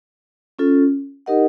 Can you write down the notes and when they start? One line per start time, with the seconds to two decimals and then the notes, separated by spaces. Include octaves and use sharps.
0.59 C#4 F4 A4
1.26 D#4 G4 A#4 D#5 F#5